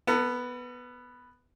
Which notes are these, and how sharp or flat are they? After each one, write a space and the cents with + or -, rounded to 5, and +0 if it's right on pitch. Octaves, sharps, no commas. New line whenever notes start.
B3 +0 A4 +45